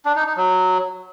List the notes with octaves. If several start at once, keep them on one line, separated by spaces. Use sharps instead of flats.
D4
D#4
D#4
F#3